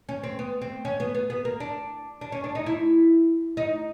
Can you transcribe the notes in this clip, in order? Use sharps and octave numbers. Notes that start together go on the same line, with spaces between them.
C#4
C4
B3
C4
C#4
B3
B3
B3
A#3
D4
D4
C#4
D4
D#4
E4
D#4